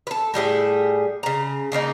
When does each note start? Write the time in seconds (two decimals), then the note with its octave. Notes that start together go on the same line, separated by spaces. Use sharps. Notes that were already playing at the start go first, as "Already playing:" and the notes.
0.07 A4 B4
0.34 A2 G3 G#4 E5
1.23 C#3 A#5
1.72 C#3 A3 A#3 D#4